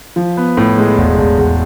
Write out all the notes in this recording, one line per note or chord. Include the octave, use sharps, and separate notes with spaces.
F3
B3
A2
G#3
E1
E1
E1